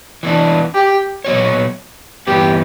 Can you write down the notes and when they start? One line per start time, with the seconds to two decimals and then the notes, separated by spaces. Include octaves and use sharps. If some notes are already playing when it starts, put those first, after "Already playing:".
0.23 E3 B3 D4
0.75 G4
1.24 A#2 F#3 B3 F#4 C#5
2.27 G2 E3 B3 G4